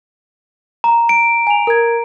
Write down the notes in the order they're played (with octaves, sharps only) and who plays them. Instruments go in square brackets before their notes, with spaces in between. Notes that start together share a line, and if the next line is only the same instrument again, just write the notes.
[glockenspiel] A#5
D7
[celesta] G#5 F7
A#4 G#6